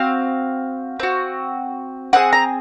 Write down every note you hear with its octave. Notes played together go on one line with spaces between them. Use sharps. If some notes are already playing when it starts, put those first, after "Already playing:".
Already playing: C4 F#4 F5
C4 F#4
C4 D#4 G#4 F#5
A#5